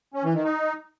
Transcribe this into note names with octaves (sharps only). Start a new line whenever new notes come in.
C#4
E3
D#3
D#4